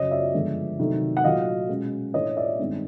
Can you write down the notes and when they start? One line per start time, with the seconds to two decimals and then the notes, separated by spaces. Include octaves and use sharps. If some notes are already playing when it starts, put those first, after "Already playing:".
Already playing: F#2 C#3 F#3 C#5 D#5
0.11 D5 E5
0.34 G2 D3 F3 G#3 B3
0.79 C3 D#3 F#3 A3
1.17 F#5
1.24 A#2 F#3 A3 D#5 F5
1.69 B2 G#3 C#4
2.14 A2 E3 A3 D4 C#5 D#5
2.37 D5 E5
2.59 G2 D#3 G#3 C4